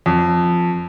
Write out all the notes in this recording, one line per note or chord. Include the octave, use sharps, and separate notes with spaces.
F2